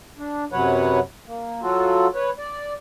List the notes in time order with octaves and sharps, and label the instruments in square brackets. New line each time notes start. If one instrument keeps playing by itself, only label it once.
[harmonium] D4
F#2 C3 F#3 B4 C#5 F#5
A#3
F#3 F4 F#4 A4
B4 C#5
D5